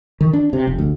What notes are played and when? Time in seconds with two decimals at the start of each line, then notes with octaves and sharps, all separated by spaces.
0.21 D#3
0.33 D4
0.53 C3
0.67 F1
0.79 D2